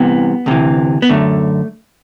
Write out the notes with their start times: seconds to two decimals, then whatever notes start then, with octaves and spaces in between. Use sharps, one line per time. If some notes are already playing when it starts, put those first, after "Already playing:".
Already playing: C2 C3 E3 B3
0.46 D2 C3 E3
1.02 B3
1.09 F#2 D3 A3